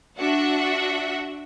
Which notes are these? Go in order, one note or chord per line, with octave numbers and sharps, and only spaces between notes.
D4 F#4 E5 F#5